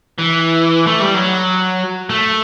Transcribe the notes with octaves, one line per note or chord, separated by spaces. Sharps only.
E3
A3
G3
F#3
A3